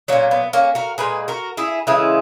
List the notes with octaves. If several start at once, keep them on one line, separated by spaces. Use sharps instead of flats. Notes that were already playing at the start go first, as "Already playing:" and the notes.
A#2 F#3 A#3 C#4
B3
A#3 C#4
F#4 A#4
A#2 G#3 G#4 B4
F#4 A#4
E4 G#4
C#3 E3 G#3 E4 G#4